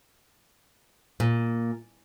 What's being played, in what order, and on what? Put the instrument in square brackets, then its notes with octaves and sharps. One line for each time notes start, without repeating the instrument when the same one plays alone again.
[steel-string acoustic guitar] A#2